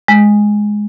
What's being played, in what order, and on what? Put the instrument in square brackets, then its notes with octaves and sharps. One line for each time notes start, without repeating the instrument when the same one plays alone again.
[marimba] G#3